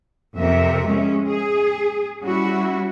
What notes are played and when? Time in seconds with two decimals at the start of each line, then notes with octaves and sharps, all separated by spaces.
0.39 F2 C3 A#4 E5
0.86 G#3 C#4
1.27 G#4
2.22 G3 C#4 E4 F#4